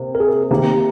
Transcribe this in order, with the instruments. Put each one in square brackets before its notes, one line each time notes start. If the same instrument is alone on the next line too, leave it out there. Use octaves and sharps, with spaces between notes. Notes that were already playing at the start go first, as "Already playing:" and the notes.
Already playing: [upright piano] C3 A#3
[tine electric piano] A#4
G#4
[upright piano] C3 D#3 A#3 D#4 [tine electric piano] G4